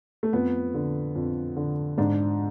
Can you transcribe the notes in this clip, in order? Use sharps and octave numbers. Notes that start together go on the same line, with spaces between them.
A3
F2 B3
D3
F2
D3
G#2 D4